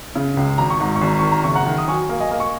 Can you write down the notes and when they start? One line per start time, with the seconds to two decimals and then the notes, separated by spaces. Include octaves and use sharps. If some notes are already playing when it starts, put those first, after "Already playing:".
0.16 C#3
0.37 C#2
0.58 G#1 A#5
0.70 C#6
0.80 G#2 A#5
0.95 C#6
1.02 G#1
1.07 A#5
1.19 D#3 C#6
1.32 A#5
1.44 F#1 C#6
1.55 F#5 A#5
1.66 D#3
1.78 D#6
1.88 F#3 G#5 C#6
2.09 A#3
2.20 D#5 G#5
2.31 A#3
2.40 C#6